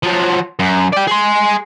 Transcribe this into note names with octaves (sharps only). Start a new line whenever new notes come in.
F3 F#3
F#2
D5 G5
G#4 C6